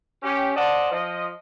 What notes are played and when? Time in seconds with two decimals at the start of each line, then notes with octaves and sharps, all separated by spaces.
0.23 C#4 G4
0.56 C5 D5 D#5 F#5 A5
0.91 F3 D#5